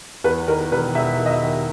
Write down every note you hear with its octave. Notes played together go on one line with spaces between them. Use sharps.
E2 B4
D#3 A#4
E1 B4
E1 E5
D#3
D#5
E5
D#3